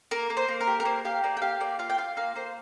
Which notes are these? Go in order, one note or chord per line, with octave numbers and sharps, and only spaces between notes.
A#3 A#4
A#3
C5
A#3
A#4
G4
A#4
A#3 C5
G4 F5
A#3 D5
G5
G4 F5
A#3 D5
F4 F5
G5
F4 F5
A#3 F5
A#3 C5